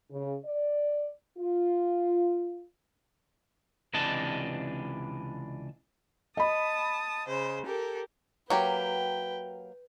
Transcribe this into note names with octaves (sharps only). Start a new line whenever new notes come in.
C#3
D5
F4
C#2 C3 E3 D4 D#5 A5
D#5 A5 B5 D#6
C#3 C5
G4 A4 A#4
F#3 A#3 G4 B4 G5